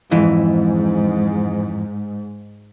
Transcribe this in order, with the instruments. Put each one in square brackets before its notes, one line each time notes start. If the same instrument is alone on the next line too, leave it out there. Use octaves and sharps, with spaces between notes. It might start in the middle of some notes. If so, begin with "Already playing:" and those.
[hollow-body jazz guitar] F2 E3 [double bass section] G#2